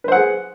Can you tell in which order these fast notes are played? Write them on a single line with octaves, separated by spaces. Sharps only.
B4 C5 F#5 G#4